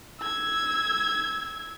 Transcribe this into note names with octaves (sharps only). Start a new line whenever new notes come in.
E6 G#6